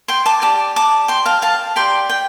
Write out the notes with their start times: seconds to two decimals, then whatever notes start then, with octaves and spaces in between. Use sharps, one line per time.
0.08 G5 C6
0.26 A5 D6
0.42 G4 D5 A5 D6
0.76 A5 D6
1.08 G5 C6
1.26 F5 A5
1.42 F5 A5
1.76 G4 D5 G5 C6
2.10 G5